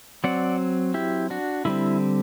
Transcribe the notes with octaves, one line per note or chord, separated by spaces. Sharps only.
F#3 C4 D5 F#5
E4 G4
D4 F#4
D3 G3 C4 E4